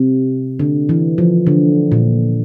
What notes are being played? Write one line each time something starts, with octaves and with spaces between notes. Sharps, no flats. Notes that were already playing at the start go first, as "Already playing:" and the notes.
Already playing: C3
D3
E3
F3
D3
A#2